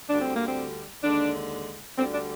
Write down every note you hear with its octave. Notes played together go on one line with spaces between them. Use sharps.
D2 D3 G3 D4
C4
A#3
C4
D#2 D3 G#3 D4
D2 D3 G3 C4
D4